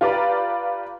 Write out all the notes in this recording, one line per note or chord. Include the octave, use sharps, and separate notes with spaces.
F4 G4 B4 D5 A#5